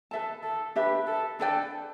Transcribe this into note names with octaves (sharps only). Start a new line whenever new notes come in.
A4 B4 E5 A5
A4
D4 G4 B4 E5
A4
D4 A4 B4 D5 G5